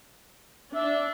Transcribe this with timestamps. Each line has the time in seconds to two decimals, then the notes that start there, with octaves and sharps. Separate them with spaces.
0.75 D4 E5